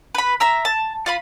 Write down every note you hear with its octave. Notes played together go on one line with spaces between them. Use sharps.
B4 B5
E5 A#5 E6
A5
F4 F5 B5